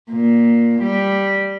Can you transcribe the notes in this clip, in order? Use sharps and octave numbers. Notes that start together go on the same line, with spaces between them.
A#2
G3